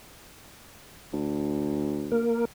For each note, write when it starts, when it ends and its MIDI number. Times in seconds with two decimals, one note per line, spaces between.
1.13 2.30 38
2.12 2.45 58
2.12 2.45 70